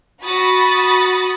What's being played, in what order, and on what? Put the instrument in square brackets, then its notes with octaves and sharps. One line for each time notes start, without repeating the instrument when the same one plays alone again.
[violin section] F#4 B5 D#6 A6